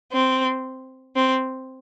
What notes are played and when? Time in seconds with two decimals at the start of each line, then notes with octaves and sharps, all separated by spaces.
0.13 C4
1.16 C4